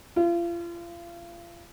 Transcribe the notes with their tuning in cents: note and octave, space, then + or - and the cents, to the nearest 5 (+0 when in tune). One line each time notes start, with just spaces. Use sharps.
F4 -35